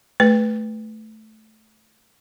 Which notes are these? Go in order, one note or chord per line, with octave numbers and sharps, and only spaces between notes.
A3 B4